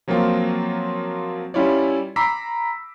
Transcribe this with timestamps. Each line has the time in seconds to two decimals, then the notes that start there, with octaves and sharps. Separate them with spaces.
0.08 F3 F#3 A#3 C4 F4
1.54 G3 C#4 E4 F4 C#5 D5
2.16 A#5 B5 D6 E6 B6 C7